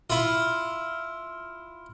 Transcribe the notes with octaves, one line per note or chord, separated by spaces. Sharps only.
E4 F4